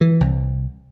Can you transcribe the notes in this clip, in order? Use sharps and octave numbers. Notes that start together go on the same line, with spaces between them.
E3
C2